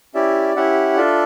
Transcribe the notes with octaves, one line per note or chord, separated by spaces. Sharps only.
C#4 E4 G4 D5 E5
C#4 E4 G4 E5 F#5
D4 F4 A4 D5 E5